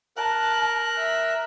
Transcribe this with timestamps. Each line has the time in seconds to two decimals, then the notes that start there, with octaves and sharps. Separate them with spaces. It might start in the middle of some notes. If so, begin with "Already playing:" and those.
0.17 A#4 A5 F#6
0.97 E5